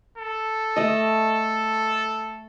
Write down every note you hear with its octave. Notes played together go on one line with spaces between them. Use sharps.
A4
A3 D#5